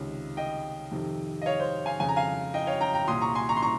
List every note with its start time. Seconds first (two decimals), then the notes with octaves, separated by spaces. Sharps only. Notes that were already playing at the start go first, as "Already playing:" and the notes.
Already playing: C#2 C3 D#3
0.37 D#5 G5
0.91 F2 C3 D#3
1.42 D#5
1.46 C#5 F5
1.60 C5
1.86 F5 G#5
2.00 F2 C#3 G#5
2.09 A#5
2.16 F5 G#5
2.54 D#5 G5
2.67 C#5 F5
2.81 G5 A#5
2.94 G5 A#5
3.08 C2 A#2 C6 D#6
3.21 A#5 C#6
3.35 G#5 C6
3.49 A#5 C#6
3.56 C6
3.62 A#5 C#6